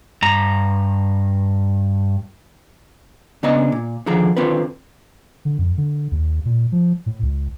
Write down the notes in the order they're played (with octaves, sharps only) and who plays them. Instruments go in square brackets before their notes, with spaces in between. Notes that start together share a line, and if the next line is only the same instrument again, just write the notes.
[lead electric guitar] G2 A#5
[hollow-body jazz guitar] C#3 B3 D4 D#5 A#5
A#2
D3 D#3 F3 G#4 A#5
D3 D#3 C4 F4 A#4 B4
[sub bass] D3
F2
D3
D#2
A#2
F3
A2
C#2